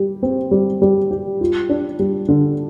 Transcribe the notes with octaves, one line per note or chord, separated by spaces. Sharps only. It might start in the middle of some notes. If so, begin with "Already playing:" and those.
Already playing: G3 G4
C4
G3
G3
G4
F4
D4
G3
D3